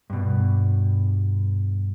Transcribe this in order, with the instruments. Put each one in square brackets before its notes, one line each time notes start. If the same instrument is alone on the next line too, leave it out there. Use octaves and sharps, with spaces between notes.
[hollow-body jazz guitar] G2 B2